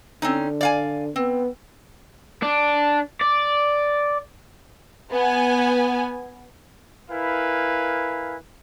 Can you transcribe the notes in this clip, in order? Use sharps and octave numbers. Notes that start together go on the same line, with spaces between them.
D3 C4 C#4 D#4
D5 F5 G#5
B3 C4
D4
D5
B3 G#5
E4 A#4 B4 F5 G#5